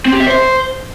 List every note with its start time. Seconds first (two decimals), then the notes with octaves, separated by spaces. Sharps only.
0.06 C4
0.13 G4
0.20 E5
0.27 C5